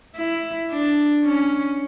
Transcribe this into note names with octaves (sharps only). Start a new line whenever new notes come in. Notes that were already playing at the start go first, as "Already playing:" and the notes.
E4
D4
C#4